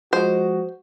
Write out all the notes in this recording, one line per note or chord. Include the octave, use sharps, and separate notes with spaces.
F3 G#3 F#4 C5 D#5